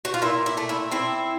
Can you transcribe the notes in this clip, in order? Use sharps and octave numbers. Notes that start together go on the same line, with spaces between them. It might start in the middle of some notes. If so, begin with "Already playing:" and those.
F#4
F4
A#2 E4
E4
A3
E4
C4 E4